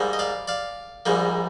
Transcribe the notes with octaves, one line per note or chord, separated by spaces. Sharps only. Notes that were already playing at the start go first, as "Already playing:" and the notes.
Already playing: G#2 G3 A#3
D#5
D5 F5
D5 F5
A#1 G#2 G3 A#3